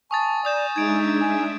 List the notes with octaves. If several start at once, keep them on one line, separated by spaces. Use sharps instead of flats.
G#5 A5 C#6 D#6 A6
D5 A#5 D#6 G6 E7
G#3 D4 D#4 E5 G#6 D7
G#5